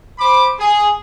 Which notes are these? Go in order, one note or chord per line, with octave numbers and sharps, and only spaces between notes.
C5 B5 D6
G#4